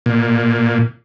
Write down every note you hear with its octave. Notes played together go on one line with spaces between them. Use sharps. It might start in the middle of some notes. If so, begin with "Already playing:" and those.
A#2